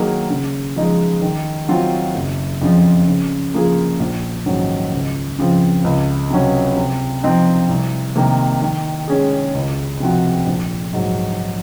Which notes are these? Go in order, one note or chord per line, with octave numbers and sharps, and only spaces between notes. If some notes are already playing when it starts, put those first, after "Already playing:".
Already playing: D#3 F#3 A#3 D#4 G#4
C#3
F3 G#3 D#4 G#4
D#3
F#3 C4 F4
F#1
F2 C#3 F3
C#3
F3 A#3 F4 G#4
A#1
G#2 D#3 F#3 C#4
C#2
C#3 F3 C4 F4
C#2
C3 F#3 C#4
C3
F3 C4 D#4
C2
C3 D#3 A#3
D#3
G#3 C#4 G#4
C#2
C3 F3 C4 F#4
A#1
G#2 F#3